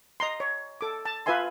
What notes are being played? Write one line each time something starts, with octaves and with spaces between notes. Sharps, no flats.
D#5 A#5 C6
C#5
A4 D6
A5
F4 B4 E5 G#5 C6